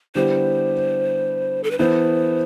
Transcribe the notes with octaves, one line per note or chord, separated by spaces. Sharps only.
D3 G3 B3 E4 G4 C5
A4
B4
E3 B3 E4 A4 C5